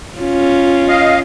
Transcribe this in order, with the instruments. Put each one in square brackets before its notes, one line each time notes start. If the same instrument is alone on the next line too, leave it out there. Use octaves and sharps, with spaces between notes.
[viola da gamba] C#4 F4
[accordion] D#5 F5